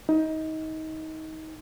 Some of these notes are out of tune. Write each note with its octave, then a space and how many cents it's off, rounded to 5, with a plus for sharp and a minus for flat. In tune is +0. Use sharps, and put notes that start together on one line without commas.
D#4 +25